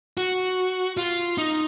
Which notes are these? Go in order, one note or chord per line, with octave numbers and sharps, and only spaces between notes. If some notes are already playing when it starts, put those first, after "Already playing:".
F#4
F4
D#4